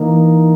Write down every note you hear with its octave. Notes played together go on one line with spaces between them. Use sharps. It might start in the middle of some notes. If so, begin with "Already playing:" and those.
Already playing: E3 A#3 D#4